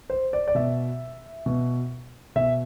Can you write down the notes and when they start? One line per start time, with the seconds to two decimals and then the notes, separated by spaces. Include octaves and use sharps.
0.10 C5
0.33 D5
0.48 D5
0.55 B2 E5
1.46 B2
2.36 B2 E5